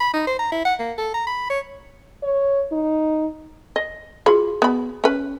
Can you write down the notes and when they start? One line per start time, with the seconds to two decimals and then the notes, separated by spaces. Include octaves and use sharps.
0.01 B5
0.14 D#4
0.27 C5
0.39 A#5
0.52 E4
0.65 F#5
0.79 A#3
0.98 A4
1.14 A#5
1.27 B5
1.50 C#5
2.23 C#5
2.72 D#4
3.76 D#5
4.26 F4 F#4 G#4 B5
4.62 B3 B5
5.04 C#4 B4